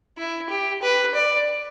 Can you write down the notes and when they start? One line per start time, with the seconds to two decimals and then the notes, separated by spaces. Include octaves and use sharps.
0.18 E4
0.50 G4
0.82 B4
1.15 D5